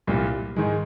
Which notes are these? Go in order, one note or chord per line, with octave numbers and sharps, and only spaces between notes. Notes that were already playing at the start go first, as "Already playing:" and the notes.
C2 A#2 G3
G#2 D#3 G#3